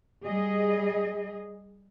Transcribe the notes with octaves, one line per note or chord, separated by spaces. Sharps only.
G3 G#4 D#5